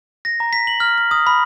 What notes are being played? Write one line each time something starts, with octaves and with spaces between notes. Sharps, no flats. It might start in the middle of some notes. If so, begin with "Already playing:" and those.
A#6
A#5
B6
F#7
F6
F6
D#6
B5